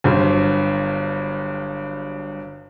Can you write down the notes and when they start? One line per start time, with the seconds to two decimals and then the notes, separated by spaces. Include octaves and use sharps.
0.04 G1 G2 F#3 C5